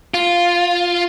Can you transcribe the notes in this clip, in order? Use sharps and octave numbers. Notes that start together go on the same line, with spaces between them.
F4